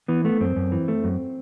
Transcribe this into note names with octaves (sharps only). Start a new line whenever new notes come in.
E3 B3
A3 B3
F#2 C4
F#2
E3
A3
F#2